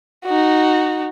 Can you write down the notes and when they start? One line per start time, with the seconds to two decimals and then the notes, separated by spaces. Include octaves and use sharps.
0.25 D#4 F#4